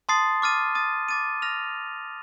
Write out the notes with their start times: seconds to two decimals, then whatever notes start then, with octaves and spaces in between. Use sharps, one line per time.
0.09 A5 C6 D#6 A6 C7
0.42 D6 F6 A6 D#7
0.75 D#6 A6 D#7
1.08 D6 A6 D#7
1.42 F6 A#6 F7